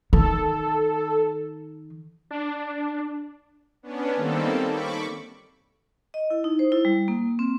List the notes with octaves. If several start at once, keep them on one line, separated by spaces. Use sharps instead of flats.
D#3 A4
D4
B3 C#4 D4
D#3 G3 A#3 C4 A4
B5 C#6 D6
D#5
E4
D#4
C5
E4
G3
A#3
C4